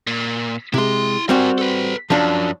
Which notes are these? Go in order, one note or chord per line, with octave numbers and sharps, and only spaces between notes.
A#2
C3 G#3 E4 C6
G3 C4 F#4 A#4 G#5
A4 B4
F#2 F3 F#3 D4